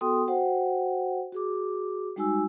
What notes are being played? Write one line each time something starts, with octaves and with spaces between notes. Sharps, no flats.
B3 F#4 A4 G5 C6 D#6
F#4 C5 F#5 G5
F#4 G#4 D6
G3 G#3 D#4 F#4 G#5 E6